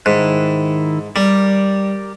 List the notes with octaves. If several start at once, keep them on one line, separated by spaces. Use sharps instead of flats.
G#2 D#3 E4 F#6
G3 G4 A#4 D5